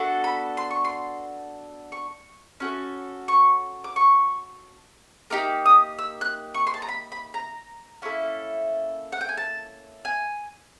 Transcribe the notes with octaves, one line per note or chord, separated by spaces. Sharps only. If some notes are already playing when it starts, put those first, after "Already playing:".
Already playing: B3 D4 F#4 A4
B5
C6
C#6
C6
C#6
C#4 F#4 A4
C#6
D6
C#6
A#3 D#4 G4 D6
D#6
E6
F#6
C#6
C6
A5
A#5
B5
B5
A#5
A#3 C#4 E4 A4
F#5
G5
G#5
A5
G#5